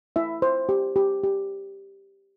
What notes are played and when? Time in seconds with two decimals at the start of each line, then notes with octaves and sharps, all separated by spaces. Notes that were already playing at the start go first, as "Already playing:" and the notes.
0.16 E4 E5
0.42 C5
0.69 G4
0.96 G4
1.23 G4